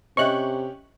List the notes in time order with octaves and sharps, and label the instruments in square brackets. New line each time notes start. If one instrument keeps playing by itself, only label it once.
[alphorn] C3 [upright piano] C#4 G4 [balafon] C5 D#5 E5 [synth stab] C#6 F#6